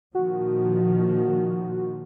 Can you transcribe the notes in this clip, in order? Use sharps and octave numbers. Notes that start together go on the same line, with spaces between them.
A#2 D#3 F3 F#4